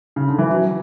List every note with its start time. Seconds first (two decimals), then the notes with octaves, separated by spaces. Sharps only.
0.16 C#3
0.28 D3
0.39 E3
0.50 F#3